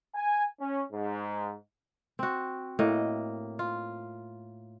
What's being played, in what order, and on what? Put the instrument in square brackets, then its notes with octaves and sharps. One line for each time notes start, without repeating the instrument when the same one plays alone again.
[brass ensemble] G#5
C#4
G#2
[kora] C4 F#4
A2 A#3 D#5
F4